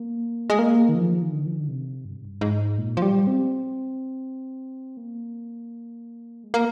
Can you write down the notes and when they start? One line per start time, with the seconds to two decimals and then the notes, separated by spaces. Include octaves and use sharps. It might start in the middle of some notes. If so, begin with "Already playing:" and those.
Already playing: A#3
0.50 G#3
0.59 A#3
0.89 D#3
0.95 F3
1.22 D#3
1.32 D3
1.46 F3
1.53 D#3
1.60 D3
1.68 C3
2.05 G2
2.16 G#2
2.25 G2
2.41 G#2
2.78 A#2
2.97 F3
3.02 G3
3.27 C4
4.97 A#3
6.44 G#3
6.54 A#3